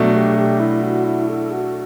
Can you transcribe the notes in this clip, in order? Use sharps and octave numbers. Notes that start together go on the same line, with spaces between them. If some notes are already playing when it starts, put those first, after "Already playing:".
Already playing: B2 F#3 A3 D4
G4
G4
E4
F#4
E4
A4
F#4